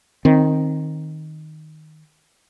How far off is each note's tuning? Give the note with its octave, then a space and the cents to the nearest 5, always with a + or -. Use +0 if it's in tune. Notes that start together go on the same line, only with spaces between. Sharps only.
D#3 +0 C4 +20